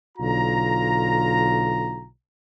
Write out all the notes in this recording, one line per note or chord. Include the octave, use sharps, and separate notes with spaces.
B1 D3 F4 A#5